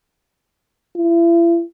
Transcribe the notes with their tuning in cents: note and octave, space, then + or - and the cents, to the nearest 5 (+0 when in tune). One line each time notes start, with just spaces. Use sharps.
E4 +40